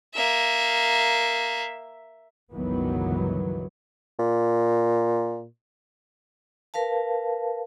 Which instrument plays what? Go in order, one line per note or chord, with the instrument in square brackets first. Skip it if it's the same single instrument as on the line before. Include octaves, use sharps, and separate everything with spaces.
[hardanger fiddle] A#3 E5
[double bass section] G1 C#2 D#3 E3 F#3 B3
[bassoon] A#2
[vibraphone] A#4 B4 F5 A5